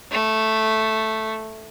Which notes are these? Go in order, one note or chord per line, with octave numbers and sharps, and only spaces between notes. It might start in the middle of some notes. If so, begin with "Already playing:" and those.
A3